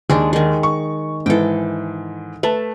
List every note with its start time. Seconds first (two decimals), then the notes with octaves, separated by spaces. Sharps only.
0.10 D#2 G#3 D4
0.33 D#3 G#3
0.63 C#6
1.26 G#2 E3 A4 G5
2.43 A3 B4 A5